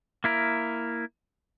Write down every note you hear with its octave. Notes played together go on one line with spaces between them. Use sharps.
A#3 E4 A#4